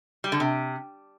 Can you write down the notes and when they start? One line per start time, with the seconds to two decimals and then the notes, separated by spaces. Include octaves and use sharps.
0.24 G3
0.32 D3
0.40 C3